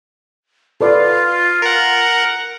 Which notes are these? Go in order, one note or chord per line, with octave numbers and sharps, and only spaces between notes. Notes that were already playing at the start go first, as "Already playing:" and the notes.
F4 A4 B4 D5
A#4 F#5